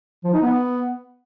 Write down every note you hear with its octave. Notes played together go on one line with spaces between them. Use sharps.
F3
D#4
B3